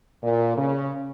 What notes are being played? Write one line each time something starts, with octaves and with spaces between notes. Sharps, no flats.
A#2
C#3